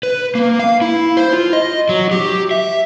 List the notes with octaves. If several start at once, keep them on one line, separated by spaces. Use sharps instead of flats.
B4
A#3
F5
E4
C5
F4
D#5
F#3
G4
E5